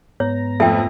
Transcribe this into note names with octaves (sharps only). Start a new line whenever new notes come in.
G#2 B3 C#5 A#5
F2 A3 E5 G5